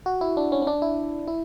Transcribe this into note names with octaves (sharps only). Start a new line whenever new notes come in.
F#4
E4
D4
C#4
C#4
D4
E4
E4